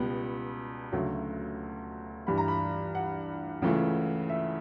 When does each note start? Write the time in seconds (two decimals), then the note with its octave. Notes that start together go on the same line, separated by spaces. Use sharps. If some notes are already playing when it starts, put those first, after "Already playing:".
Already playing: C#2 B2 G3 B3
0.92 D2 C#3 F#3 A3
2.27 G2 E3 G3 B5
2.38 A#5
2.48 B5
2.95 F#5
3.62 C#2 C#3 E3 A3
4.29 E5